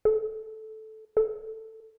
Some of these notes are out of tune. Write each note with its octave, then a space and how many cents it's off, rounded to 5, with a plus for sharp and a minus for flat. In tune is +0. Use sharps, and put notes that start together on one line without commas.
A4 -10
A4 +10